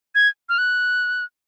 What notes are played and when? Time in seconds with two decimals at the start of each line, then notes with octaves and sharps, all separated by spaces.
0.15 G#6
0.49 F6
0.58 F#6